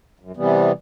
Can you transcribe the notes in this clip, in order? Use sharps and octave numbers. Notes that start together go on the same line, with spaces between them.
F#2
C3 E3 G3 B3